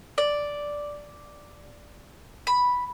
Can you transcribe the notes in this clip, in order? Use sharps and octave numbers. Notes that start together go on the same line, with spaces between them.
D5
B5